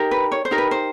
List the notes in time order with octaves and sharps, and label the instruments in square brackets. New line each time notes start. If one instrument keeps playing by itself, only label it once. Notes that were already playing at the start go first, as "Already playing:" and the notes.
Already playing: [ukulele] D#4 G4 A#4
B4
C#5
C5
D#4 G4 A#4
B4
C5